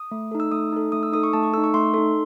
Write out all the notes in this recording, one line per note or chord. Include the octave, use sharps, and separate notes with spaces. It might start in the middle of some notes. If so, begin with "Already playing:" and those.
Already playing: D#6
A3
D#4 A4
E6
A3 D#6
D#4 A4
A3 D#6
E6
D#4 A4 D#6
C#6
A3 A5
C#6
D#4 A4 E6
C#6
A3 C6
D#4 A4